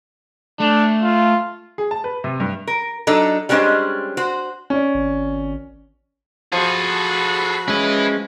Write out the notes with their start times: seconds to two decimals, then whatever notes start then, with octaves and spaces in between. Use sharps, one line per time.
0.60 A3 D4
1.03 F4
1.78 G#4
1.91 A5
2.04 B4
2.24 C3
2.40 G2
2.67 A#4
3.07 F#3 D4 D#4 A4
3.49 G3 G#3 C#4 D4 C5 D#5
4.17 F#4 C5
4.70 C#4 D5
4.94 G#1
6.52 F3 F#4 G#4 A4 B5
7.68 G#3 C#4 E4 B4